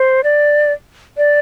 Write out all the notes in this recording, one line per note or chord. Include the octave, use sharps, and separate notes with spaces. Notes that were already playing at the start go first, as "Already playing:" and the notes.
Already playing: C5
D5
D5